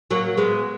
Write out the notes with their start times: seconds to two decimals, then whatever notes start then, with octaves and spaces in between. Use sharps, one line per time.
0.11 F#3 A#3
0.37 G#3 B3